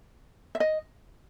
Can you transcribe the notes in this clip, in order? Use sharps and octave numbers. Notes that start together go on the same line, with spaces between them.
E5
D#5